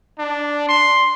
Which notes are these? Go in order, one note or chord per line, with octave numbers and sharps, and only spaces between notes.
D4
C6